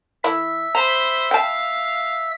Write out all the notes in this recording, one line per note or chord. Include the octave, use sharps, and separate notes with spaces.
E3 E4 A4 E5 E6
C5 A#5 B5
F5 G5 A5